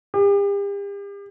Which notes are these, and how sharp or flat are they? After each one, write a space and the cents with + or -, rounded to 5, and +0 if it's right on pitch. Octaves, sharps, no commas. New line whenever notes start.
G4 +40